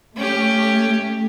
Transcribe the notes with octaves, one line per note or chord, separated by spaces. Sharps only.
A3 C#4 G4